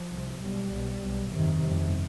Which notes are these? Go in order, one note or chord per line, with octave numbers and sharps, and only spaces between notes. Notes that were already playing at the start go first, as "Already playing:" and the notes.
Already playing: F3
C2 C3
B1 B2 G3
B1 B2
B1 B2
G1 F2 C3 D#3
G1 F2 C3